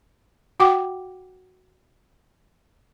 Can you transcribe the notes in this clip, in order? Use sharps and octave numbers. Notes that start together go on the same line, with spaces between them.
F#4 F#5 G5 D6